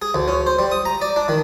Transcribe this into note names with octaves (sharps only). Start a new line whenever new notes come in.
G#4
D2
C#4
C5
G3
D#6
A#5
D5
D4
D#3